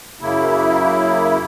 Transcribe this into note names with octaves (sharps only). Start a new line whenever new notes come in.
F#2 C#3 A#3 E4